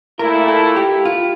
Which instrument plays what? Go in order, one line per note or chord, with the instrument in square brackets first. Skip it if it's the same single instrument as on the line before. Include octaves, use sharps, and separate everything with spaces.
[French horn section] A#2 A3 E4 [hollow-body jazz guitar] A#4
[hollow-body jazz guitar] A4
G4
F4